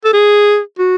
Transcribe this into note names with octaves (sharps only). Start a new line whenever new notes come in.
A4
G#4
F#4